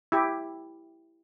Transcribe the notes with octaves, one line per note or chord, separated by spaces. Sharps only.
E4 G4